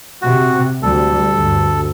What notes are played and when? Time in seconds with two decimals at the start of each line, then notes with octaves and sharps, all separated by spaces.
0.22 C3 F#4
0.83 D2 G3 A4
1.30 D2 G2